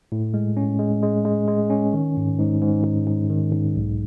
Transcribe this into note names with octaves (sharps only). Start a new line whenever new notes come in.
A2
G#3
C#4
G#3
G#3
G#3
G#3
C#4
D#3
G#2
G#2
G#2
G#2
G#2
D#3
G#2
B1